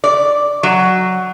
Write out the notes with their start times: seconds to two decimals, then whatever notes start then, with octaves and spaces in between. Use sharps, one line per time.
0.04 D5
0.63 F#3